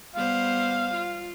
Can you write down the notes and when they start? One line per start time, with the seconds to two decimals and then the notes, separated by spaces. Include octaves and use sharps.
0.15 G3 B3 C5 F5
0.94 F4